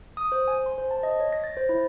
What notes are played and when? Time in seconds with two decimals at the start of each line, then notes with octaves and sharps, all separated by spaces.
0.17 D#6
0.32 C5
0.48 G#5
0.66 C6
0.78 C5
0.91 A5
1.03 D#5
1.20 C#5
1.33 A#6
1.44 A6
1.57 C5
1.69 E4